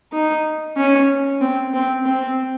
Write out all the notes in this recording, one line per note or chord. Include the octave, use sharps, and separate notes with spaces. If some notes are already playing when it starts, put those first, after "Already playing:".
D#4
C#4
C4
C4
C4